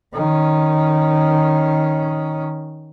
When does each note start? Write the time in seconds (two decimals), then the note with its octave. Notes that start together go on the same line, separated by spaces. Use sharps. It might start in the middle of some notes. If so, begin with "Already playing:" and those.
0.14 D#3 C#4